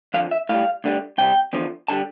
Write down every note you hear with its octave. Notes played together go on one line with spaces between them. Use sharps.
F2 D3 F3 F5
E5
A2 G3 F5
D2 D3 G3
C2 C3 G3 G5
E2 D3 F3
D3 G3 A5